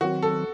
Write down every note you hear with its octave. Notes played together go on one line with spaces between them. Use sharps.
D#3 F#3 C4 F#4
A4